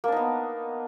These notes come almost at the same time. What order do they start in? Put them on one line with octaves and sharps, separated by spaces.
A#3 D4 D#4 B3